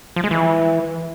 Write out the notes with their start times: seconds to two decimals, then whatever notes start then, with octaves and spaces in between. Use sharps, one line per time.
0.16 F3
0.24 G#3
0.31 E3